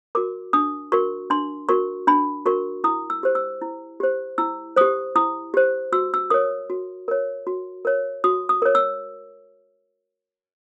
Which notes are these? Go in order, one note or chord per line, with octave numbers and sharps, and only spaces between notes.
F#4 A#4 D6
D4 D#6
F#4 A#4 C#6
D4 C6
F#4 A#4 C#6
D4 B5
F#4 A#4 C#6
E4 D#6
E6
G4 C5
E6
E4
G4 C5
E4 E6
G4 C5 D#6
E4 D#6
G4 C5
F#4 E6
E6
A#4 C#5 D#6
F#4
A#4 C#5
F#4
A#4 C#5
F#4 D#6
D#6
A#4 C#5
E6